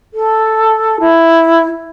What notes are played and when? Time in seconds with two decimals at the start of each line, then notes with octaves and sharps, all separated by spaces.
0.14 A4
1.00 E4